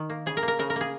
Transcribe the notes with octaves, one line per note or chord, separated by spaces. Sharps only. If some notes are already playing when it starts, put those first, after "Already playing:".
Already playing: D#3
A#3
C#3 G#4
A#4
A#3
A#4
C#3 A#4
A#4
A#3 G#4